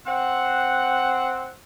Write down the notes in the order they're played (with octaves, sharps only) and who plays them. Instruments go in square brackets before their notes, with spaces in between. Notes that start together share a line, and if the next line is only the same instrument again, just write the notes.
[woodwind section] C4 F#5